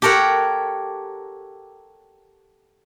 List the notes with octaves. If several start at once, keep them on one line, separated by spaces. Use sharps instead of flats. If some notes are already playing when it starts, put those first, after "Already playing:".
G4 A4 A#4 C#5 F#5